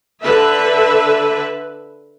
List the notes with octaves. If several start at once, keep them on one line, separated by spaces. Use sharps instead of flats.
D3 B4 E5